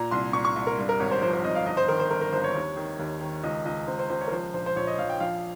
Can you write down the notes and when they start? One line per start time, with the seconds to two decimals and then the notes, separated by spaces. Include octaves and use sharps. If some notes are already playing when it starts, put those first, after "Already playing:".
Already playing: A#2 A#5
0.11 C2 C6
0.33 A#2 C#6
0.45 C#6
0.56 C2
0.67 A#4
0.78 G2
0.89 A#4
1.00 G#1 C#5
1.11 C5
1.22 F3 C5
1.33 C5
1.44 G#1 D#5
1.55 F5
1.66 G1 D#5
1.77 C5
1.88 D#3 A#4
2.00 C5
2.10 G1 A#4
2.22 A#4
2.33 G1 C5
2.44 C#5
2.55 D#2
2.77 D#3
2.99 D#2
3.21 D#3
3.43 C#2 D#5
3.65 C#2 D#5
3.87 C#2 C5
3.99 C5
4.10 C#2 C5
4.21 C#5
4.27 A#4
4.32 F3 C5
4.54 A#1 C5
4.66 C5
4.76 A#1 C#5
4.87 D#5
4.98 A#1 F5
5.09 G5
5.20 F3 F5